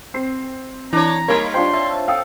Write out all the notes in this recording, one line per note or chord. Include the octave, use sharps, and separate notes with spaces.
C4 C7
E3 D4 C#5 A#5
G3 A#3 D#4 C#5 B5 C6
D4 F4 C5 G5 C6
C4 C#5 E5 A5
A4 F5 G5 D#6